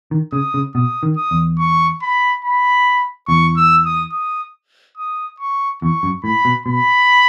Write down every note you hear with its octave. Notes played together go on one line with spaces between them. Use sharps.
D#3
C#3 D#6
C#3
B2 D#6
D#3
D#6
E2
C#6
B5
B5
E2 C#6
E6
D#6
D#6
D#6
C#6
E2 C#6
F#2
A2 B5
B2
B2 B5